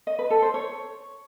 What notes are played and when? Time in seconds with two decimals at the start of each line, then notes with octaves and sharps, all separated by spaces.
0.07 D#5
0.19 B4
0.30 A4
0.42 C5
0.54 C#5